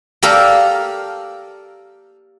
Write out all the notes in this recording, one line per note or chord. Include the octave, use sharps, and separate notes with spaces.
A#3 G4 A4 A#4 D5